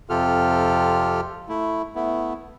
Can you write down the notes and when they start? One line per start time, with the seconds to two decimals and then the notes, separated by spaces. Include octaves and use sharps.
0.10 F2 C3 F4 G4 A4 F6
1.49 A3 E4
1.95 A3 B3 E4